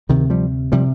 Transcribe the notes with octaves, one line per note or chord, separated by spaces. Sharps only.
D2 C3 D#3
F3 G3
C3 F3 G3